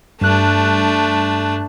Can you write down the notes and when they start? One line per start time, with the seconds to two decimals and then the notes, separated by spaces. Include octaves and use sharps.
0.21 G2 A3 D4 F#6